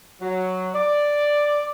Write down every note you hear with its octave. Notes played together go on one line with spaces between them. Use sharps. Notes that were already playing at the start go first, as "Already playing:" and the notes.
F#3
D5